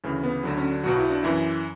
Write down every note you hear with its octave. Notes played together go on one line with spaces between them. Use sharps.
D2 C#3 E3 C#4
B3
D2 D3 F#3
C#4
D4
B1 B2 F#3 F#4
E4
D4
F#2 E3 E4